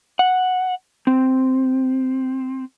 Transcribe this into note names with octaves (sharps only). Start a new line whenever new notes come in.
F#5
C4